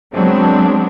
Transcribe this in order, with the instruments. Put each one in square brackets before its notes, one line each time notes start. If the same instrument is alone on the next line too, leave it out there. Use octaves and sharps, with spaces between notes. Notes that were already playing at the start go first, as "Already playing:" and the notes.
[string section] F#3 G#3 B3 C4 D4